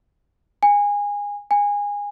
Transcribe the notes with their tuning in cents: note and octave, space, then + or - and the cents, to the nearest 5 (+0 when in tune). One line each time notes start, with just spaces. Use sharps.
G#5 -20
G#5 -20